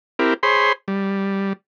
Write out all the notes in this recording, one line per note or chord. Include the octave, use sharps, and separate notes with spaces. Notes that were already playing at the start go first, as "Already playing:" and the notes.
C4 E4 G4 A#4
G#4 C5 C#5 B5 C6
G3